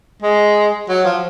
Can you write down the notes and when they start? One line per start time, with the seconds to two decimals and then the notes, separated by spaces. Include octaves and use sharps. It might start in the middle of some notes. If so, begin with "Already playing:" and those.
0.22 G#3
0.89 F#3
1.05 F3